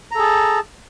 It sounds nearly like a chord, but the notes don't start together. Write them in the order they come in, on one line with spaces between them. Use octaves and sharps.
A#5 A4 G#4 A5